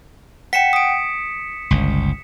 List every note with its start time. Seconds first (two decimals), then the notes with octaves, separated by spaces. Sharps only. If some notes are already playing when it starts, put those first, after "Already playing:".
0.53 F#5 G5 B6 C#7 E7
0.73 D#6 D7
1.70 G1 C#2